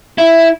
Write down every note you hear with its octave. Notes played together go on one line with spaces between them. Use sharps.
E4